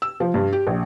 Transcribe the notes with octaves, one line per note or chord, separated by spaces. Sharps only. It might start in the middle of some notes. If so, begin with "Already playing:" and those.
E6
F3
G2
G4
A#1